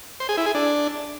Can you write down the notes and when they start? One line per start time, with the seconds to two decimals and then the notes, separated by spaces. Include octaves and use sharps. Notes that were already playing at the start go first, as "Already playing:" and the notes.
0.20 C5
0.29 G#4
0.37 E4
0.46 G#4
0.55 D4